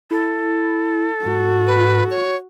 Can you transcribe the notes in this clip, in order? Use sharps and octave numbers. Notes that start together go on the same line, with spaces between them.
E4 A4
G#2 F#4
B4
C#5